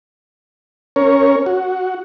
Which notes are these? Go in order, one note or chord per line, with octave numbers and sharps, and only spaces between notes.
C#4 A#4 C#5
F#4